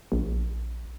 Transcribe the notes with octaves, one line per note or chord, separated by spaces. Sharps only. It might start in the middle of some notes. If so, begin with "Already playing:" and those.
A#1